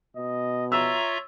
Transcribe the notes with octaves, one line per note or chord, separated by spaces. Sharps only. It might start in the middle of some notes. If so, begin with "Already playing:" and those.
B2 D#5
F4 C#5 E5 A#5 E6